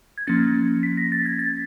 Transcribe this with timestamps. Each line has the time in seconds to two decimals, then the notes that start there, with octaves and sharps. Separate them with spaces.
0.18 G#6
0.27 F3 A#3 C#4 A6
0.83 B6
0.97 A#6
1.12 A6
1.26 G#6
1.39 A6